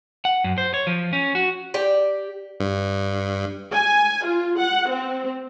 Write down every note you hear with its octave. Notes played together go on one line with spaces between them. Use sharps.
F#5
F#2
C5
C#5
F3
C#4
F#4
G4 D5
G2
G#5
F4
F#5
C4